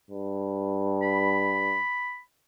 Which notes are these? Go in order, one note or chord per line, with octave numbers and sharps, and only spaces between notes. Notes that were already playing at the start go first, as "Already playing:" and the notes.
G2
B5